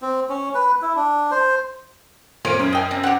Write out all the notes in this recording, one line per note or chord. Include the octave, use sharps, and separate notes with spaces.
C4
C#4
B4
E4
D4
C5
A#2 C4 C#4 F5 D7
F#2
D#5 G5 G#5
C4
C4 G4 F#5